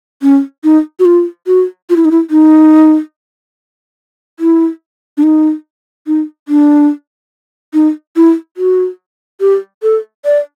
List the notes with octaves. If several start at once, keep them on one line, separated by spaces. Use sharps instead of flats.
C#4
D#4
F#4
F4
F#4
F4
E4
D#4
E4
D#4
E4
D4
D#4
D#4
D4
D#4
E4
F#4
G4
A4
D5